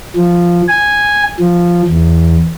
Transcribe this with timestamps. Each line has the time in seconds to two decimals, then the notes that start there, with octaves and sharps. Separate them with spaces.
0.16 F3
0.68 G#5
1.40 F3
1.88 E2